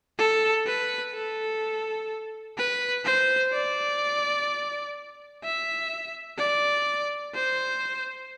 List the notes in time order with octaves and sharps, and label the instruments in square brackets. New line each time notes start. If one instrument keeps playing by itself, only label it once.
[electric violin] A4
B4
A4
B4
C5
D5
E5
D5
C5